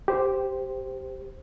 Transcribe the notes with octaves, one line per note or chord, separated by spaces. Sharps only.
G4 C5